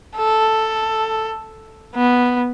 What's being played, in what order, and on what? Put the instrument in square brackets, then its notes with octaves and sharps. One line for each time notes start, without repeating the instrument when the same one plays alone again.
[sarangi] A4
B3